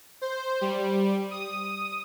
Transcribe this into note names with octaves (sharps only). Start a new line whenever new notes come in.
C5
G3
D#6